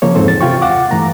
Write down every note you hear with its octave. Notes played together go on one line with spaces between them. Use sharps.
C#3 F3 A#3 C#5
F2 G#2 E3 C4 A4 C5
A6
C3 F4 G5 C#6
D#2 F5 F#5 D6
G2 E3 A3 A#5